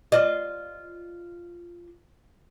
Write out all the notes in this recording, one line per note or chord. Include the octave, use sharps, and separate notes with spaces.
F4 D5 D#5